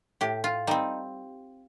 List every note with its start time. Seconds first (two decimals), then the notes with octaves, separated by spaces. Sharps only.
0.21 A2 G4
0.44 F4
0.67 G3 C4 D#4